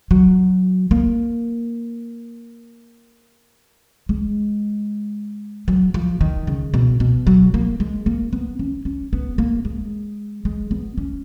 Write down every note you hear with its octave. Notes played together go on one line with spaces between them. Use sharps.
F#3
A#3
G#3
F#3
F3
D#3
C#3
B2
B2
F#3
A#3
G#3
A#3
B3
C#4
C#4
B3
A#3
G#3
G#3
B3
C#4